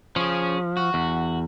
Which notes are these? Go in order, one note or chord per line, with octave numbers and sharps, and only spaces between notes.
F3 C#4 G#4
F#4
E2